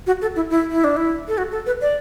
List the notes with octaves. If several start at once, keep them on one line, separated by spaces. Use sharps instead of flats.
F#4
A4
E4
E4
E4
D4
E4
A4
F#4
A4
B4
D5